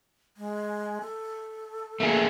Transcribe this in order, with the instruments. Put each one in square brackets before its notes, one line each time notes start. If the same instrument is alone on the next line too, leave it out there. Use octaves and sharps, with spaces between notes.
[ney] G#3
A4
[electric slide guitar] A3 A#3 G#4